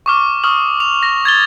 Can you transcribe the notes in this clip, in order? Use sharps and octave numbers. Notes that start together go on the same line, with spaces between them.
C#6 D6 F6
C#6 D#6 F6 F#7
F7
A#6
G#6 A6 G7